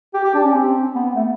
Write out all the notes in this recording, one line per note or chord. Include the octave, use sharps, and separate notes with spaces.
G4
G4
D4
C#4
C4
B3
B3
A3